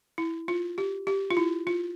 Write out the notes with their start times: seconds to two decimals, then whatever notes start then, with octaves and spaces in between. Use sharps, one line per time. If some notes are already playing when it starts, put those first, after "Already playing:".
0.18 E4
0.48 F4
0.78 G4
1.07 G4
1.31 F4
1.37 E4
1.67 F4